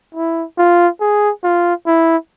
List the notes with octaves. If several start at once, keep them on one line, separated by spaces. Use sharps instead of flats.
E4
F4
G#4
F4
E4